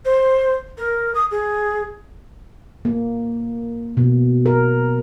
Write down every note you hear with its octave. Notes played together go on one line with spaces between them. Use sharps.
C5
A#4
D#6
G#4
A#3
B2
A#4